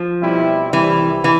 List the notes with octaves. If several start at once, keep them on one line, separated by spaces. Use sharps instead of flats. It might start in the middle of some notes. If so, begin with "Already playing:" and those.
Already playing: F3
B2 G3 C4 E4
C2 C3 E3 G3
E3